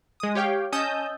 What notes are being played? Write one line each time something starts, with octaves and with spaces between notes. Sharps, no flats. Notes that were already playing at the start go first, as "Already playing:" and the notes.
G#3 D#6
G4 C#5 F5 G5
C#4 D#5 A5 D#6 E6 G6